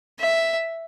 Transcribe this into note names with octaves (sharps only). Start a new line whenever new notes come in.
E5